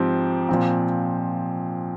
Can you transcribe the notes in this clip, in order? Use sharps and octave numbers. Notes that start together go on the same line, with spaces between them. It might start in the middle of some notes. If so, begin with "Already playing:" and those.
Already playing: G#2 F3 C4 G4
A#2 F3 C4